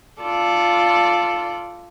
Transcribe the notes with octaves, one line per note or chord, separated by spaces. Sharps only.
F4 A4 D5